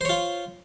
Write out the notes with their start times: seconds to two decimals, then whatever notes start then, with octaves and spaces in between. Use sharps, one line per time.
0.01 C5
0.05 C#5
0.09 F4